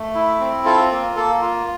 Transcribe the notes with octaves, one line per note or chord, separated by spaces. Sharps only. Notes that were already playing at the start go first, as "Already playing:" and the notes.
Already playing: A3
E4
C4
F4 A4
A#3
A#3 A4
F4